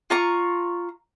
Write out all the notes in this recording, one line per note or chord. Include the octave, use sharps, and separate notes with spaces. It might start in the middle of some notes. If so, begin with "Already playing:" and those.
F4 A#5 C#6